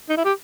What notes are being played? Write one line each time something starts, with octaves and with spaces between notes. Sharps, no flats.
D#4
E4
G4